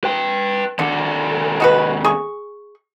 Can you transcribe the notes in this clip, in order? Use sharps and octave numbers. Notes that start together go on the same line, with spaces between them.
B4 G5
D#2 D3 A4
G#3 F#4 B4
G#4 C#6